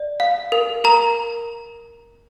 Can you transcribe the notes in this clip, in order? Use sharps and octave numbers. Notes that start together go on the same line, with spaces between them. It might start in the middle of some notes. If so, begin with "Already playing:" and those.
Already playing: D5
F5
A#4
A#4 A#5